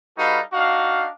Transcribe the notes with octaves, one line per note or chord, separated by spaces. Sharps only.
G3 D#4 F#4 A4 B4 F5
D4 D#4 F#4 F5